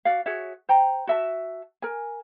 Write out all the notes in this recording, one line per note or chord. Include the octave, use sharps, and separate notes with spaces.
F#4 D5 F5
F#4 G#4 C#5 E5
C5 G5 A#5
F#4 E5 A5
A#4 G#5